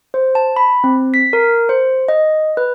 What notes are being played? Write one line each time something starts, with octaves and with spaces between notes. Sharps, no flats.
C5
A5
B5
C4
B6
A#4
C5
D#5
B4